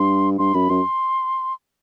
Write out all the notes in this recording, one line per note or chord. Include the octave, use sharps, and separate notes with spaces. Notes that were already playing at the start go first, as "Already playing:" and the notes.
Already playing: G2 C6
G2 C6
F#2 B5
F#2 C6